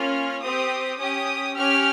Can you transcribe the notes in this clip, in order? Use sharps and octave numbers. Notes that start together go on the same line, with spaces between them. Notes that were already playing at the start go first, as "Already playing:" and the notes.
Already playing: A#3 C#4 F4 F6
C4 G4 D#6
C#4 G4 D#6
C#4 G4 F6